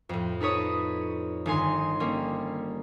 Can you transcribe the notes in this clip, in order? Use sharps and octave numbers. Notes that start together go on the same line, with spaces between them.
F2 A2
D#4 A4 B4 C#5 D#6
G1 D#3 D#4 G#5 C6 C7
G3 A#3 C#4